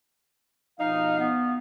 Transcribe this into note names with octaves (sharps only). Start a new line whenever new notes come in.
B2 F3 D#4 F5
B3